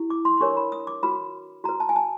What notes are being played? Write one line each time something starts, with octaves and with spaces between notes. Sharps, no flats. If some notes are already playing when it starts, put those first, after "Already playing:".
Already playing: E4 G4
D6
C6
C6
D4 G4 A#4 C#5 C#6
B5
D#6
D6
F#4 B4 B5
F#4 B4 A#5
A5
G#5
A5